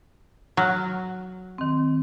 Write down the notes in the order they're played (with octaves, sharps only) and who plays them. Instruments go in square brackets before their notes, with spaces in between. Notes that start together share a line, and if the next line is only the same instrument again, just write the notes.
[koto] F#3 [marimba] F6 F#6
[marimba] D#3 C4